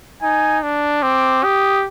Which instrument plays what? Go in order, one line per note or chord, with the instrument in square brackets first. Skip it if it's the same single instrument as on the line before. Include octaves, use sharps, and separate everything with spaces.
[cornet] D#4 [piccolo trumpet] G#5
[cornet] D4
[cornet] C4 [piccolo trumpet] D6
[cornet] G4 [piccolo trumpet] D#6